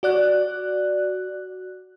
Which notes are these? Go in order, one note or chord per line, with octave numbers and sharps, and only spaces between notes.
F#4 D5 F#6